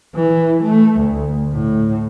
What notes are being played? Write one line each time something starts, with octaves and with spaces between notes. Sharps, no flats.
E3
A3
D2
A2